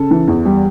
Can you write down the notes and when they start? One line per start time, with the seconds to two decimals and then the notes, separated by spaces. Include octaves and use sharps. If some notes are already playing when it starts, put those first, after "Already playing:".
Already playing: C#3 A4
0.11 E3
0.28 E2
0.45 G3